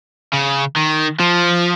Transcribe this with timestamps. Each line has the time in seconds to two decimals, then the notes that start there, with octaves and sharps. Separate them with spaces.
0.33 C#3
0.76 D#3
1.20 F3